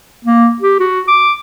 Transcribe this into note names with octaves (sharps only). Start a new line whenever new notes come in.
A#3
G4
F#4
D6